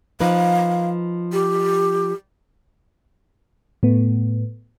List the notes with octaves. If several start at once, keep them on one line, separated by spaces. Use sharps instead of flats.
F3 D#4 B4 F5
G4
A2 A3 B3